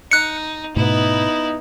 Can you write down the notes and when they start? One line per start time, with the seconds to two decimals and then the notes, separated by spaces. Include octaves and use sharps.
0.11 D#4 F#6 C#7
0.76 G#2 B2 A3 B3 D#4 E4